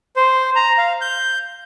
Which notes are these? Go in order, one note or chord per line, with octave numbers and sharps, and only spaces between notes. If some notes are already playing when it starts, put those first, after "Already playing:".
C5
A#5
F5
G6